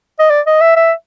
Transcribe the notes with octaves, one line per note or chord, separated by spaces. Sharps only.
D#5
D5
D#5
E5
E5